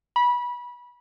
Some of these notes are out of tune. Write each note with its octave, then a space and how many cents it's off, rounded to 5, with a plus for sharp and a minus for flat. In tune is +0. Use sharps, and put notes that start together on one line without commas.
B5 -25